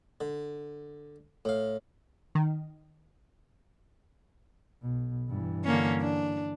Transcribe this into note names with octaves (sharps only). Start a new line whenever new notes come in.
D3
A2 F5
D#3
B1 B2
G2 E3
D3 A#3 C#4
D4